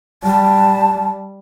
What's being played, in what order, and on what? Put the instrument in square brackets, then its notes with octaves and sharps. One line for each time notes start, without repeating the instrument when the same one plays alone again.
[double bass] G3 [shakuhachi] A5